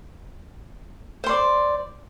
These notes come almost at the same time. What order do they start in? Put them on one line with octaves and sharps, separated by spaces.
C5 C6 D5